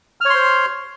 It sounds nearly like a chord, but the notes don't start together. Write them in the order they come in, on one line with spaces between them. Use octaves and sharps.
F6 C#5 C6 C5